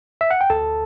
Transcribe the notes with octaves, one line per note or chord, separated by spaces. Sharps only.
E5
F#5
G5
D2 A4 A5